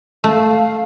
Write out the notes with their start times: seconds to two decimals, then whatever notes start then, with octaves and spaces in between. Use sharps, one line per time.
0.24 A3 F5
0.48 F5